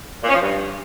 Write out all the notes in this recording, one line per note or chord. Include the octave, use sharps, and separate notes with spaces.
A#2
C#4
F3
G2